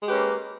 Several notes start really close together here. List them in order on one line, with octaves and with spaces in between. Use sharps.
G#3 G4 B4 C#4 A#3